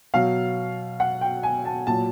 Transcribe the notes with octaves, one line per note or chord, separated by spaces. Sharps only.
B2 F#3 F5
F#5
G5
G#5
A5
A#2 F#3 A5